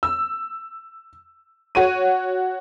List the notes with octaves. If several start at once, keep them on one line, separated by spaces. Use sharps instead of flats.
E6
F#4 C#5 D#7